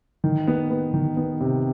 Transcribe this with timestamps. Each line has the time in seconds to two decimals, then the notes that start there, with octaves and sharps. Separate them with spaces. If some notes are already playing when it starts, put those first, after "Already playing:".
0.24 D#3
0.48 B3
0.70 B3
0.94 D#3
1.17 B3
1.40 C3